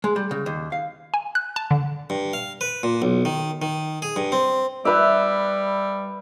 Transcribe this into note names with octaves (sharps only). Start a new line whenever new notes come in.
G#3
G3
C#3
D#2
F5
G#5
F#6
A5
D3
G2
F5
B4
A#2
B1
D#3
D#3
G#4
G2
C4
G3 B4 E5